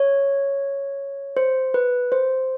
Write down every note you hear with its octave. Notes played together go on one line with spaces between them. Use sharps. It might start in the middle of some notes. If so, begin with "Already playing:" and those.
Already playing: C#5
C5
B4
C5